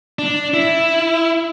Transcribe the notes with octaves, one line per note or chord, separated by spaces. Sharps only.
D4
E4